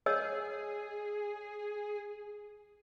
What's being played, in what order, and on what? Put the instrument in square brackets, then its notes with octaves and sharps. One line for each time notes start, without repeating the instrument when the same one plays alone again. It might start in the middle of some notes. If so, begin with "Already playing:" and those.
[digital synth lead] G#4 [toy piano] C#5 D#5 E6